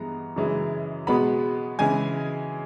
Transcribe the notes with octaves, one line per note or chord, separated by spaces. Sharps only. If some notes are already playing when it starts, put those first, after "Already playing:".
Already playing: G2 E3 G#3 B3 A#5
F#2 C#3 E3 G#3
B2 G#3 B3 B5
C#3 E3 G#3 G#5